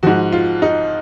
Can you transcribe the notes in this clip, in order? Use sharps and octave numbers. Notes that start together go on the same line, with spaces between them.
G#2 F3 F#4
F4
D#4